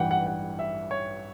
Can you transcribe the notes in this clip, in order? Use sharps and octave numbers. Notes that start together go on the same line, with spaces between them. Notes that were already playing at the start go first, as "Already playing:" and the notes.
Already playing: A1 G2 E3 F#5 G5
F#5
F#5
E5
C#5